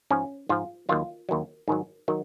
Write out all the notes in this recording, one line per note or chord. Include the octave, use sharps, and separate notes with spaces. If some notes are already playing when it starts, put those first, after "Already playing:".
G#2 F3 C#4
G#2 F3 F4
D#2 D#3 F#3 F4
D#2 D#3 F#3
G#2 D#3 F#3
D#3 F#3